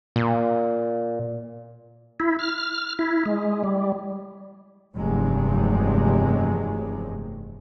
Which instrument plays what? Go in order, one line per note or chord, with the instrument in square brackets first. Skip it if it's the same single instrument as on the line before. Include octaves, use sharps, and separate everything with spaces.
[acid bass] A#2
[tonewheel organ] E4
F6
E4
G#3
G3
[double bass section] F1 E2 G2 C3 F#3 G#3